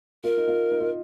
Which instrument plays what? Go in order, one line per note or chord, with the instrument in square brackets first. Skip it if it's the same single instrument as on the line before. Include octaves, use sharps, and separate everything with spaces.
[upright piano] F4 [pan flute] A#4
[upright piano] D#4
F4
D#4
F4